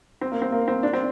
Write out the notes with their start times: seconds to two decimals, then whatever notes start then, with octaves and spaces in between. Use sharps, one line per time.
0.21 C4
0.32 A#3
0.42 C4
0.52 A#3
0.68 C4
0.83 D4
0.93 C4